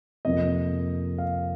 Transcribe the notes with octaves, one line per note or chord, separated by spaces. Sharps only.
F2 C3 F3 A#3 D#5
F5